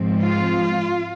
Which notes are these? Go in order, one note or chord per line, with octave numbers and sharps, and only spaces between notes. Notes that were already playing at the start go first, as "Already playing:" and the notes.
Already playing: G#2 F3 C4
F4